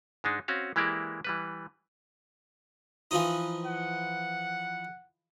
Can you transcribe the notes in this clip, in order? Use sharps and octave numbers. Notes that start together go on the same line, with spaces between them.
G#2 G#3 D4 D#4
C4 C#4 F#4 F5
E3 G#3 A#3 E4 G4 D5
E3 G3 B4
E3 F3 D#4
F#5